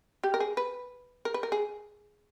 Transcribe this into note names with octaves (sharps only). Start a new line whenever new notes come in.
G4
A#4
G#4
B4
A#4
B4
A#4
G#4